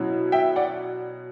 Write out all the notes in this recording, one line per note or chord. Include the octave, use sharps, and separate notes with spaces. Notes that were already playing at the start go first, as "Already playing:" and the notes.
Already playing: B2 F#3 C#4 E4
E5 G5
D5 F#5